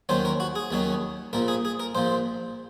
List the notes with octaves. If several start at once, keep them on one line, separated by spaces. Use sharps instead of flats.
D#2 D#3 F#3 C#4 C5
A#4
F#4
G#4
D#2 D#3 F#3 C#4
A#1 A#2 F3 A#4
G#4
G#4
A#4
A#1 A#2 F3 C5